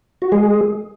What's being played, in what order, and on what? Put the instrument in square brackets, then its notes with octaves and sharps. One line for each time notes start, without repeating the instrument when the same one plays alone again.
[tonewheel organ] F#4
G#3 G#4